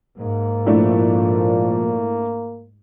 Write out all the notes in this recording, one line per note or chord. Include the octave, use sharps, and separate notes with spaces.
G#2 A#3
A#2 F3 A3 D4 E4